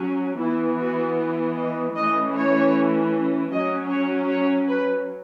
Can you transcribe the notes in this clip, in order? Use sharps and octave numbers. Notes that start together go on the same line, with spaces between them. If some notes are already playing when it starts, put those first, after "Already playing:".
Already playing: F#3 C#4
E3 B3 E4
F#4
D#5
E3 A3 C#4 D#5
C#5
F#3 C#4 D#5
C#5
C#5
B4